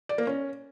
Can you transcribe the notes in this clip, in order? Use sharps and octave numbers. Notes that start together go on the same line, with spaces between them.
D5
A#3
C#4